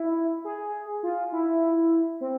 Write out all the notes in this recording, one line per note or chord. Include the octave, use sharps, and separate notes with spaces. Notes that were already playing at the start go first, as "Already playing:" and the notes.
Already playing: E4
G#4
F4
E4
C4